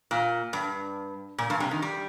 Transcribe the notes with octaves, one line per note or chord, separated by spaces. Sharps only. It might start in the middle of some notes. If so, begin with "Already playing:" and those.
A#2
G2
A#2
G2
C3
D#3
G3